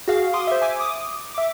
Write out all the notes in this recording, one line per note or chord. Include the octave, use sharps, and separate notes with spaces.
F#4 G#4 F5
C6 D6 D#6
C5 E5
E5 G#5 D6
D6 D#6
E5 D6